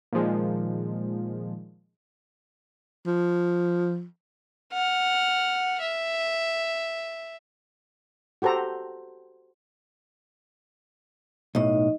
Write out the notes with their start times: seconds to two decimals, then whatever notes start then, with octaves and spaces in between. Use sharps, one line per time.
0.13 A#2 D#3 F3 G#3
3.06 F3
4.72 F#5 F6
5.81 E5
8.42 F#4 G4 A4 C5 A#5
11.55 B1 A2 D#4 D#5